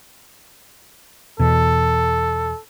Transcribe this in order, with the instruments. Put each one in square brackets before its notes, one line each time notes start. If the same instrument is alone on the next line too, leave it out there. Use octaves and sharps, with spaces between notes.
[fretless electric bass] E2 B2 [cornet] A4